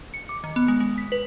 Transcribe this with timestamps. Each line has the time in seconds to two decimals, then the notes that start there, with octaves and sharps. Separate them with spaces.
0.14 C#7
0.29 D6
0.44 D#3
0.56 B3
0.68 G#3
0.80 G#3
0.98 B6
1.12 B4